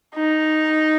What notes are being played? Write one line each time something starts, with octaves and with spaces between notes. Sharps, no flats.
D#4